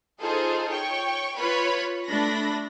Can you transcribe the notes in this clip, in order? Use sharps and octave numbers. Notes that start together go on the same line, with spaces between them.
D#4 F4 G#4 A4 C5
C#5 G5 C#6
F4 B4 C#5 B5
A3 D4 B5 A#6